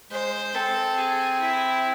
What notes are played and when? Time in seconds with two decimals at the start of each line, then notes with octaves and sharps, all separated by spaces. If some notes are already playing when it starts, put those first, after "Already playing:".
0.11 G#3 C5
0.55 C4 A4
0.98 G#4
1.40 E4